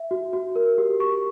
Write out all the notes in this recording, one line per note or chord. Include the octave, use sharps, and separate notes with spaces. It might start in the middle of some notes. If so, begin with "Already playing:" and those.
Already playing: E5
F#4
F#4
A#4
G4
C#6